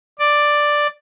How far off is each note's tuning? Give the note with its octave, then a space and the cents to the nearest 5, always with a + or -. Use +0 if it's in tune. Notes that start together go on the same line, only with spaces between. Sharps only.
D5 +5